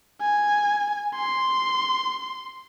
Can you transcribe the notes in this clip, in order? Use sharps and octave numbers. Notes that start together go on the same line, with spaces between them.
G#5
C6